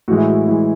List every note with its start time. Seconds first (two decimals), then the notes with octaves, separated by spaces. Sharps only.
0.08 A2 E3 G#3 F#4
0.17 E4
0.28 F#4
0.48 A2 E3 G#3 E4